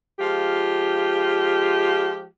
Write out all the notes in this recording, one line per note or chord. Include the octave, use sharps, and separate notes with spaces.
F3 G#3 F4 G4